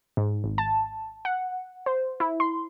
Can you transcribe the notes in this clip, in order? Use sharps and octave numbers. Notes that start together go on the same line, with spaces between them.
G#2
G#1
A5
F#5
C5
E4
C6